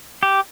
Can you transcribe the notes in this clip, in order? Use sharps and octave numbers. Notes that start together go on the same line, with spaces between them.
G4